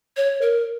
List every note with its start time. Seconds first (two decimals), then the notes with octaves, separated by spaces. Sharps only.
0.17 C#5
0.42 A#4